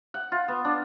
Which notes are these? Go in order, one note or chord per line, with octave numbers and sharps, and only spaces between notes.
F#5
F4
B3
D4